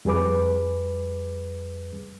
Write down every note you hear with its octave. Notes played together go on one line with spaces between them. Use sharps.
F2 G3 G#4 B4 D6